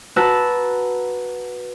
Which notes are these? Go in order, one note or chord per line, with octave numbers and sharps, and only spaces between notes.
F#4 B4 A5 A#5 E6 F#6